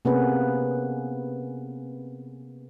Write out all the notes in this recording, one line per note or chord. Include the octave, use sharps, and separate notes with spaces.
C3 A#3 B3 C#4 G#4 B4